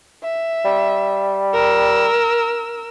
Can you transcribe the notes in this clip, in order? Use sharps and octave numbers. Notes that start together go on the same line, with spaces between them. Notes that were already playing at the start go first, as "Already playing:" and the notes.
E5
G3
A#4 E6